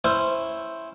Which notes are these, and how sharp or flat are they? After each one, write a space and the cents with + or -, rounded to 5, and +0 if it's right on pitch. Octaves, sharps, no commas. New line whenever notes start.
C#4 -15 E4 +0 C5 +0